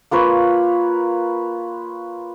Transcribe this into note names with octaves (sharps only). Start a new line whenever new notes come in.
A#3 F4 B4 C#5